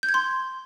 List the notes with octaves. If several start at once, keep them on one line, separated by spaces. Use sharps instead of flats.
G6
G#6
C6